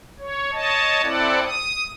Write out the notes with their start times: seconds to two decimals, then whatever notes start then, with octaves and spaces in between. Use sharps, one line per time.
0.19 C#5
0.52 C#5 D#5 A5
1.03 C4 E4 A4 D5 F#5
1.44 D#6